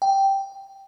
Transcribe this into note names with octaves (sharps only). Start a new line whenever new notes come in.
G5